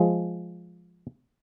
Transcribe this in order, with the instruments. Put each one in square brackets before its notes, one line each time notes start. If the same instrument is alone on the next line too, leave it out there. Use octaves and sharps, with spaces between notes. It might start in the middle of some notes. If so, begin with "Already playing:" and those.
Already playing: [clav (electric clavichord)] F3 G#3